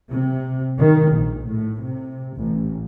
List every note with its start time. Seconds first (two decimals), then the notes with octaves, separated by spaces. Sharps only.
0.10 C3
0.78 D#3
1.13 A#1
1.47 A2
1.81 C3
2.36 A1